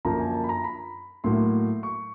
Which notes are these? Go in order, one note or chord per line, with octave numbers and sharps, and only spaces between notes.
F#2 D3 F3 A#3 A#5
G#5
A5
B5
A#5
B5
A2 F#3 A#3 C6
C#6